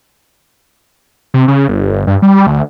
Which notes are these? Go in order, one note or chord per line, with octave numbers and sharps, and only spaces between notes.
C3
C#3
G1
G1
G2
G3
D2